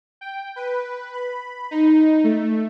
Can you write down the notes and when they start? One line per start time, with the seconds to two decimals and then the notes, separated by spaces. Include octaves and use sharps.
0.21 G5
0.56 B4
1.13 B5
1.71 D#4
2.24 A3